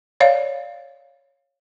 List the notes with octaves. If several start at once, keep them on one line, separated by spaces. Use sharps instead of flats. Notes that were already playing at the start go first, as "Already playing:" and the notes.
C#5 D5 F5